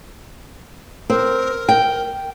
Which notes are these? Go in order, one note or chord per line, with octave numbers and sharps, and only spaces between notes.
C4 A#4
G5